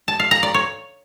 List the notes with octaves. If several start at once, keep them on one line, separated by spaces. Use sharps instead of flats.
A5
F5
A#5
D5
C#5